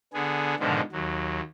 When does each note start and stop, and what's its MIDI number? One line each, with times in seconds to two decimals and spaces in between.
0.13 0.55 50
0.13 0.55 59
0.13 0.55 68
0.59 0.81 44
0.59 0.81 47
0.59 0.81 50
0.59 0.81 51
0.59 0.81 53
0.92 1.41 39
0.92 1.41 54